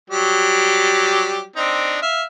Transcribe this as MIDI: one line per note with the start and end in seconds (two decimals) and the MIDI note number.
0.10 1.46 54
0.10 1.46 55
0.10 1.46 67
1.56 1.98 60
1.56 1.98 62
1.56 1.98 63
2.02 2.24 76
2.02 2.24 77